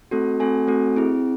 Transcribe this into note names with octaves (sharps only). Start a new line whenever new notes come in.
A3 C4 F#4 A4
A3 C4 F#4 A4 G#5
A3 C4 F#4 A4
C4 E4 G#4